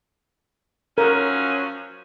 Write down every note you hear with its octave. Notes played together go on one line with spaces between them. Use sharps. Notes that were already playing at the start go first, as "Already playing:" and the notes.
F3 F#3 C#4 A#4